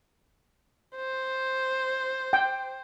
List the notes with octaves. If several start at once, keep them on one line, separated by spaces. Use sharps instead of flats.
C5
G5